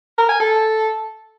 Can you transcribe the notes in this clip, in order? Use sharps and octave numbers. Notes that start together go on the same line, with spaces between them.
A#4
G#5
A4